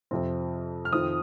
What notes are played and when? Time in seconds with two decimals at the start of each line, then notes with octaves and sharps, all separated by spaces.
0.11 F2 C3 F3 C4 F4
0.85 F6
0.92 F2 D#3 C4 F4 D#6